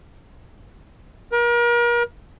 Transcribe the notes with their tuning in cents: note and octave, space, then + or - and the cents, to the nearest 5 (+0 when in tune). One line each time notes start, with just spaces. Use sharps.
A#4 +40